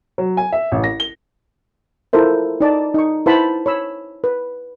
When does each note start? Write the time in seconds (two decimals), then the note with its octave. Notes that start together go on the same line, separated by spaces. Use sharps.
0.18 F#3
0.37 G#5
0.52 E5
0.72 A1
0.84 A#6
1.00 G7
2.13 E4 F4 A4 A#4 C5 E5
2.61 D#4 D5 A5 D6
2.95 D#4 C#6
3.26 E4 B4 C5 F#5 A5 B5
3.66 C#5 B5 E6
4.24 B4